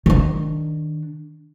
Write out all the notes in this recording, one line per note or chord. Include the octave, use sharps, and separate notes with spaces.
D#3 D4